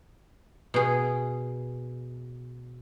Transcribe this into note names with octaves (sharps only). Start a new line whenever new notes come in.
B2 G#4